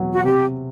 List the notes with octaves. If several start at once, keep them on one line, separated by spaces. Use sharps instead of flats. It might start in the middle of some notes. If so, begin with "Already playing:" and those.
Already playing: E1 E2 B2 F#3
F#4
C3 G4